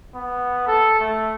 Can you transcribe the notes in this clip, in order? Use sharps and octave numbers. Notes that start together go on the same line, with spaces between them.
B3
A4
A3